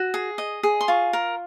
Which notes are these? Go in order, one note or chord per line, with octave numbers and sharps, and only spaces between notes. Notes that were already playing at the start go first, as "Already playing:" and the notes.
Already playing: F#4
G#4
D#5
G#4
C6
F4 C#6
A#4